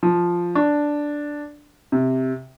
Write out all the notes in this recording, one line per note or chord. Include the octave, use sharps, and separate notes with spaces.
F3
D4
C3